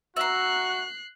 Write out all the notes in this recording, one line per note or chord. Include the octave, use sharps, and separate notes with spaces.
F#4 E5 A#5 F#6 C7